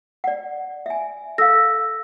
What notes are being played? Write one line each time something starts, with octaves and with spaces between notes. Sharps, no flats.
D5 F#5
E5 G#5
A4 F5 E6 A#6